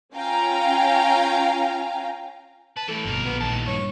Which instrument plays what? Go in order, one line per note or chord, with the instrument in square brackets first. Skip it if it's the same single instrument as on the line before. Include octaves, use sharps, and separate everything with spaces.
[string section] C#4 F4 F5 G5 G#5 A#5
[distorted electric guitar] B4 [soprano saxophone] A5
[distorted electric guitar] A2 E3 [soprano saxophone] A4
[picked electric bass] G1 B2 [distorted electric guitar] F2 A#4
[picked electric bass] A#1 [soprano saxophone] B3
[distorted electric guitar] D#2 A2 [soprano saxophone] A5
[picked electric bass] G2 [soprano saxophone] C#5